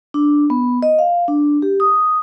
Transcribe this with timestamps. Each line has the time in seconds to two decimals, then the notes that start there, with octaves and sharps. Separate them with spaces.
0.14 D4
0.50 B3
0.83 D#5
0.99 F5
1.28 D4
1.62 G4
1.80 D#6